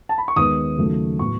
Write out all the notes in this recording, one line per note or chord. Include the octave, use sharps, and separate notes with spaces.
A5
B5
C#6
D#2 D#3 G#3 B3 D#6
D#2 C#3 F#3 A3
A2 F#3 B3 C#6